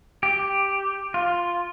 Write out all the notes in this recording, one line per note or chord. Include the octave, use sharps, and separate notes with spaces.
G4
F4